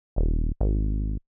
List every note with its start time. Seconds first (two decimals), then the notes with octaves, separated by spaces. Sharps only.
0.16 D#1
0.61 G#1